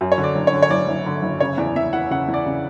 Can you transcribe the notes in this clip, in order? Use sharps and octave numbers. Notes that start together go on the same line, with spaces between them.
F#2
C#5
D3
D5
F#1
C#5
D3
C#5
F#1 D5
F#1
D3
F#1
C#3 C#5
E2 D5
E2 E5
E3 F#5
C#3 F#5
E2
D5
C#3